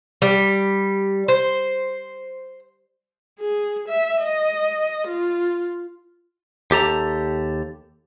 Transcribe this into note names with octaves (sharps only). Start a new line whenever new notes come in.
G3
C5
G#4
E5
D#5
F4
D#2 G4 A4 A#5